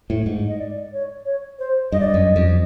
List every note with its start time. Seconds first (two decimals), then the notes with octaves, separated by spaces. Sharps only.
0.10 A2
0.26 G#2
0.48 D#5
0.59 D5
0.93 C#5
1.25 C#5
1.59 C5
1.92 G2 D#5
2.00 D5
2.07 D#5
2.14 F#2
2.36 F2